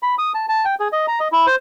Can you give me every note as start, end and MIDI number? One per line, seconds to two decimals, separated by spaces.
0.03 0.15 83
0.18 0.32 87
0.34 0.46 81
0.49 0.65 81
0.65 0.75 79
0.80 0.88 68
0.92 1.06 75
1.08 1.19 82
1.20 1.28 75
1.32 1.46 64
1.47 1.56 72